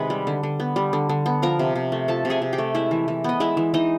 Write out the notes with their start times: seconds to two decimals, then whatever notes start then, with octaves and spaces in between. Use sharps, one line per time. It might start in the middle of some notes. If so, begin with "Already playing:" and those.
Already playing: C3 D#3 G#3 B3 B4 B5
0.10 G3
0.27 D3
0.43 D3
0.60 B3
0.76 G3
0.93 D3
1.09 D3
1.26 B3
1.42 F3 A#4 A#5
1.59 C3
1.75 C3
1.92 A3
2.08 F3 A4 A5
2.25 C3
2.30 G#4 G#5
2.42 C3
2.53 G4 G5
2.58 A3
2.75 G#3 E4 E5
2.91 E3
3.08 E3
3.24 B3 D#5
3.40 G#3 E4 E5
3.57 E3
3.74 E3 D#4 D#5